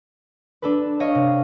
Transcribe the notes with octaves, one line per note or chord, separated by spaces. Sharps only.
D4 A4 B4
C#5 D#5 F5
C3